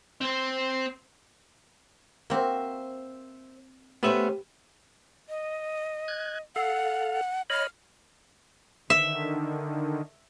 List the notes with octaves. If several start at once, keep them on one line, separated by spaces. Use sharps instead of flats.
C4 C5
A#3 C4 F#4 C5 E5
A3 B3 C#4 G4 B4 C5 E5
D#5
F#6 G#6
A4 F5 F#5
C#5 D#5 B5 F6
D3 D#3 E5